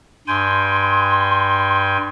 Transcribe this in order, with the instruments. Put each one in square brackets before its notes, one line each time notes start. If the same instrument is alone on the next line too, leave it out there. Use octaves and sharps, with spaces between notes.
[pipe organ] G2 G5 G#5 [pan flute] C6